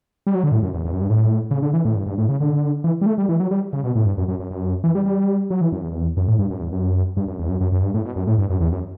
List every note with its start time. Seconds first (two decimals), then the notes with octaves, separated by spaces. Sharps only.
0.27 G3
0.35 F#3
0.43 D3
0.52 A2
0.63 F#2
0.74 E2
0.85 E2
0.93 F#2
1.02 G2
1.10 A2
1.51 C#3
1.62 D3
1.73 E3
1.85 A2
1.96 G2
2.06 G2
2.18 A2
2.29 C#3
2.40 D3
2.84 E3
3.01 G3
3.06 A3
3.18 G3
3.29 E3
3.40 F#3
3.51 G3
3.73 C#3
3.84 B2
3.95 A2
4.06 G2
4.18 F#2
4.28 F#2
4.40 F#2
4.51 F#2
4.84 E3
4.95 G3
5.06 G3
5.50 F#3
5.61 E3
5.72 F#2
5.83 E2
6.17 F#2
6.28 A2
6.39 G2
6.50 F#2
6.61 E2
6.72 F#2
7.17 G2
7.28 F#2
7.39 E2
7.49 F#2
7.61 F#2
7.72 F#2
7.83 G2
7.94 A2
8.05 B2
8.16 F#2
8.27 A2
8.38 G2
8.50 F#2
8.60 E2
8.72 F#2